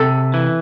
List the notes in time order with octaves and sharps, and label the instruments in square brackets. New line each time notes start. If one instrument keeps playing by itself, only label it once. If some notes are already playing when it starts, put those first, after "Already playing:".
Already playing: [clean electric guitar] C3 [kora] A4
[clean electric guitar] E3